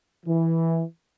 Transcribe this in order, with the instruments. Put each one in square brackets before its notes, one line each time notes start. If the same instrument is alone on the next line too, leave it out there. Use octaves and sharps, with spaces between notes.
[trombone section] E3